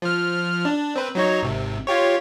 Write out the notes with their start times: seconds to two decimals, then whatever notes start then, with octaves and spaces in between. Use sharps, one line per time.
0.02 F3 F6
0.65 D4
0.96 C4 B4
1.15 F#3 D#4 C#5
1.43 G#1 C3
1.87 F4 G4 C#5